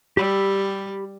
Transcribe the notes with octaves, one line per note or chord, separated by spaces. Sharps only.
G3 G4 B5 E6